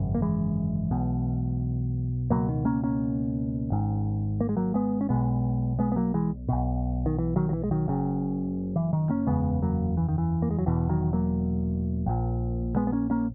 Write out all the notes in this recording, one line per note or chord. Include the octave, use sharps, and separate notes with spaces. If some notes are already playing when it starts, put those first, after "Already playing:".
Already playing: G#1 F#2 C#3
A#3
E3 G#3
B1 B2
C#2 B2 F#3 A#3
D#3
A#3 C#4
A#3 C#4
G#1 G#2
A#3
G#3
F#3 A#3
G#3 B3
C#4
B1 B2 G#3 B3
G#3 B3
B3
F#3 A#3
E3 G#3
B1 B2
D#3
E3
D#3 F#3
F#3
E3
G#3
D#3 F#3
F#1 F#2 C#3
E3
D#3
A#3 C#4
F#1 E2 C#3 G#3 B3
F#3 A#3
E3
D#3
E3
A#3
G#3
F#3
E1 E2 B2 E3
D#3 F#3
F#3 A#3
A#1 A#2
G#3 B3
B3
A#3 C#4
A#3 C#4